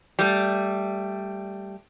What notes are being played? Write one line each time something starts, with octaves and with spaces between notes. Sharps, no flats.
G3 A3